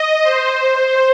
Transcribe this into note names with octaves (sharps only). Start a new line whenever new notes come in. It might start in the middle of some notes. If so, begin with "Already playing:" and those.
Already playing: D#5
C5
C5